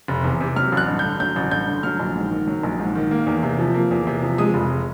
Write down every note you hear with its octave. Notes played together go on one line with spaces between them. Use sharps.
F1
E2
C3
F#3 F6
A1 F#6
G2
G6
D3
F#3 G6
A1
G2 G6
D3
F#3 F6
A#1
G#2
D#3
F#3
A#1
G#2
D#3
A#3
E2
C3
F3
A#3
E2
C3
F3
G#3 D#6
F1